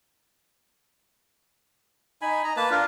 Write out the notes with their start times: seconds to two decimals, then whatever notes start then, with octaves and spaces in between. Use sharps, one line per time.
2.22 D#4 G#5 B5
2.44 D#5 A#5
2.57 A#3 B4 A5
2.71 D4 F4 A#4